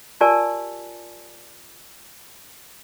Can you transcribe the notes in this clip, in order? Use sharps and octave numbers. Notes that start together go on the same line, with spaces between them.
F4 G4 A#4 D5 G#5 A5